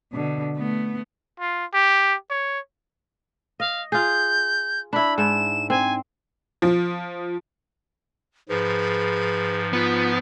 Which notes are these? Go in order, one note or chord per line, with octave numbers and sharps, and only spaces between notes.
B2 D3
A3 B3
F4
G4
C#5
D#5 F5
F4 G#4 G6
D4 E4 B5
G#2 E4 E7
C4 G#5
F3
G#2 F3 G#4 B4
B3 F4